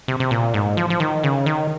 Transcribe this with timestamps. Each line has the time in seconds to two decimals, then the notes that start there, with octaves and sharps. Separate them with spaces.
0.08 C3
0.20 C3
0.31 A#2
0.54 G#2
0.77 F3
0.90 F3
1.00 D#3
1.24 C#3
1.46 D#3